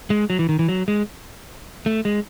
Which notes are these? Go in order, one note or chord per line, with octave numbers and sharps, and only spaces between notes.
G#3
F#3
E3
D#3
E3
F#3
G#3
A3
G#3